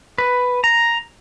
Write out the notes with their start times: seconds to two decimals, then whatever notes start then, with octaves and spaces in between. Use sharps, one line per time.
0.18 B4
0.64 A#5